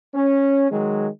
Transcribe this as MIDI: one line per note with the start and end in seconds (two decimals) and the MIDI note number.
0.15 0.67 61
0.71 1.08 51
0.71 1.08 54
0.71 1.08 56